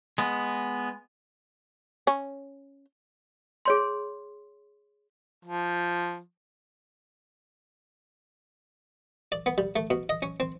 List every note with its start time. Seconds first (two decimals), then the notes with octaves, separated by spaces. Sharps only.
0.18 G#3 B3
2.07 C#4
3.65 G#4 C#5 C6
5.45 F3
9.32 D5
9.46 B3
9.58 G3
9.76 A3
9.90 B2
10.09 D#5
10.22 C#4
10.40 C4